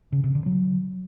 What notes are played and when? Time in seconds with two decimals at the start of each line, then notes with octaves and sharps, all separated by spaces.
0.12 C#3
0.24 C3
0.35 D3
0.46 F#3